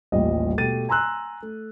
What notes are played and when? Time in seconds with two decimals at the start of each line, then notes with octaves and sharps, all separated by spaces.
0.12 D#1 A1 G3 D#5
0.57 B2 A3 G4 A6 D#7
0.89 G#5 A#5 C6 E6 F#6
1.42 A3